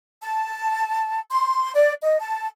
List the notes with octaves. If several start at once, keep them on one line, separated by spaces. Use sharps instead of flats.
A5
C6
D5
D#5
A5